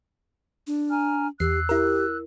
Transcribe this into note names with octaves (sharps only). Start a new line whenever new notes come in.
D4
G#5 A#5 F6
E2 G4 E6 F#6 C7
E4 G4 A#4